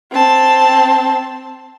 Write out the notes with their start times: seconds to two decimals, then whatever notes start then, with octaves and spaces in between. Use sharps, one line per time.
0.12 C4 A5